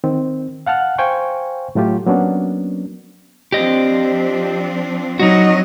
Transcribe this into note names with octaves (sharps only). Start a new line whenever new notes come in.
D#3 C4
F5 F#5 A5 F6 F#6
C5 F5 G5 G#5 C#6
A2 F#3 A3 F4 G4
F#3 A#3 B3 C#4 D4
F3 C4 D4 G4 D#5
F#3 D#4 F#4 D#5